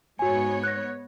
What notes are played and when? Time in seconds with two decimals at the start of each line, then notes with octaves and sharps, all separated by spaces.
0.19 G#2 B3 F#4 C#5 G#5
0.64 F#6 A#6